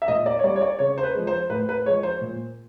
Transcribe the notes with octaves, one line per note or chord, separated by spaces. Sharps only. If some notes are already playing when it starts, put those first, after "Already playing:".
E5
A#2 D#5
D5
C#5
G3 D5
C#5
D5
C#3 C#5
C5
B4
F3 G#3
C5
A2 B4
B4
F3 G#3 C#5
C5
A#2